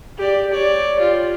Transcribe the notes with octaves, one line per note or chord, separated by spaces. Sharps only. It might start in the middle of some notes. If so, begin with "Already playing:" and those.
G4 D5
C#5 D5
F4 G4